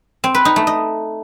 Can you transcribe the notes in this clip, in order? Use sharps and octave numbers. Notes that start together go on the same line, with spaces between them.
C4
B4
D#4
A3
D#5